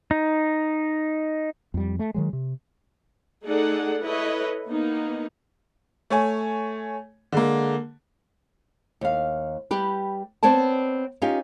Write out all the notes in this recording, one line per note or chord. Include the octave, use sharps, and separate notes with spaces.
D#4
F2 G3
A3
D#3 F#3 G#3
C3
A3 D#4 G#4 A4 D5 F#5
E4 A4 B4 C#5 D#5
A#3 B3 D#4
A3 C#5 G#5
D3 G#3 A#3
D#2 F5
G3 G4 B4
B3 C4 C#5 D5 A5
C#4 D#4 F4 G4